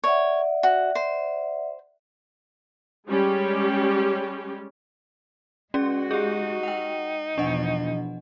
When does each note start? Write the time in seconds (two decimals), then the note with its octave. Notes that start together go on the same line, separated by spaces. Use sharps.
0.04 C#5 D5 E5 F#5
0.63 F#4
0.95 C5
3.07 G3 G#3 C#4 G4
5.74 G#3 C#4 F#4 G#4 D5
6.11 D#4 G4 G#4
6.63 F#5 G5
7.38 E2 B2 F3 D4 D#5 F#5